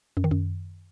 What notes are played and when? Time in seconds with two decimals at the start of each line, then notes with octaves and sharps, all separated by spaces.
0.17 F#2
0.24 D#3
0.31 F#2